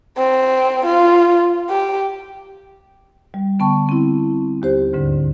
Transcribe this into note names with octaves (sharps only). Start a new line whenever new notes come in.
C4
F4
G4
G3
D3 B3 G5 A5 C#6
C4 E4
D#2 G4 C5
D2 G#2 D3